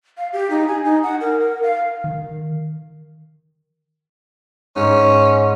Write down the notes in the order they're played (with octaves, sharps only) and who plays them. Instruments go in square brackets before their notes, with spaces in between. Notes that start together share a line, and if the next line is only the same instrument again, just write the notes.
[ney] F5
G4
D#4
G#5
D#4
F#5
A#4
A#4
F5
[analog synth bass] D#3
[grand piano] G#2 [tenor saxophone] C#4